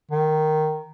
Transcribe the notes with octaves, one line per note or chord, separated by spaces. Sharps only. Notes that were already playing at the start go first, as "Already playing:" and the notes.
D#3